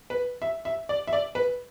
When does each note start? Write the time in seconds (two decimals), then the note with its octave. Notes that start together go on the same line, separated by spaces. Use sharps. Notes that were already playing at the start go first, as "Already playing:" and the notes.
0.10 B4
0.42 E5
0.65 E5
0.89 D5
1.07 E5
1.13 D5
1.35 B4